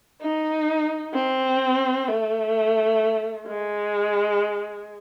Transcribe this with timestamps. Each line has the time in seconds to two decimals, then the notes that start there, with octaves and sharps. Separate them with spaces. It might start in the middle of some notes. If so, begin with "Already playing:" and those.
0.22 D#4
1.14 C4
2.08 A3
3.47 G#3